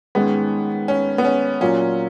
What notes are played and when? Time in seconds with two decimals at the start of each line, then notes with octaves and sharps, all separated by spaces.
0.15 G#2 D#3 G#3 B3 C#4
0.88 C#4
1.18 B3
1.25 C#4
1.61 A#2 F#3 A#3 C#4 F4